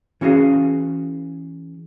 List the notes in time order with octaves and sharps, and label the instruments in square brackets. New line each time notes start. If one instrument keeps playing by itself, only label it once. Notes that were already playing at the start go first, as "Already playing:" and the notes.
[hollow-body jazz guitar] E3 C#4 F#4 G#4 F5